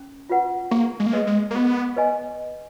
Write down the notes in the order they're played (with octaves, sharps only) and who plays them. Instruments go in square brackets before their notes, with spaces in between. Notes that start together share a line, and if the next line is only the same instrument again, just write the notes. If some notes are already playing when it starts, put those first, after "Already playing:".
Already playing: [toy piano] C#4
F4 B4 F#5
[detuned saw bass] A#3 [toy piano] G#4
[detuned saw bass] G#3
A#3
[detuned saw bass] G#3 [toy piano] B4 D#5
[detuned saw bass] G#3
A#3
[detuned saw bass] B3 [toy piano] G#4
[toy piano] B4 D#5 G#5